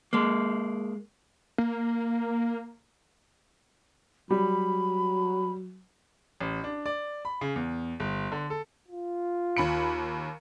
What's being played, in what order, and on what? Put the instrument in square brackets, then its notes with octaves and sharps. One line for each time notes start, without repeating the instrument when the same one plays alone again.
[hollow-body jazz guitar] G#3 A#3
[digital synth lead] A#3
[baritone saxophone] F#3 [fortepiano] G3 [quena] B5
[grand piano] A1
D4
D5
B5
C#3
E2
G1
D3
A4
[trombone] F4
[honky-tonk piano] D#2 B5 C#7